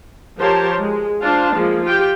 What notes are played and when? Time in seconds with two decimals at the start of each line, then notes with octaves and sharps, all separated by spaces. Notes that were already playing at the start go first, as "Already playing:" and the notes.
0.38 F3 G4 A#4 C5 C#5 A5
0.79 G#3
1.22 D4 F4 C5 F5 A5
1.53 F3 G#3 A#3
1.84 F4 G4 G5